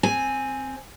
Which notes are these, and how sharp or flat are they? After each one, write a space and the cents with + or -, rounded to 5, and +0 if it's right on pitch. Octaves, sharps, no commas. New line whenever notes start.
C4 +0 G#5 +0